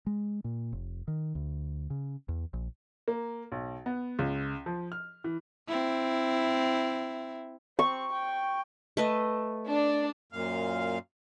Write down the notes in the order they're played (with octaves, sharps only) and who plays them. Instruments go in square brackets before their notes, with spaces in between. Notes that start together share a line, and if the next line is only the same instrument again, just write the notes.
[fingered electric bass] G#3
A#2
F1
D#3
D2
C#3
E2
A#1
[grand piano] A#3
B1
B3
C#2
F3
F6
E3
[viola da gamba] C4 E4
[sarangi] C4 [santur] C#6
[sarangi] G5
[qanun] A3 B4 D#5
[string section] D4
[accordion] F#2 A#2 F5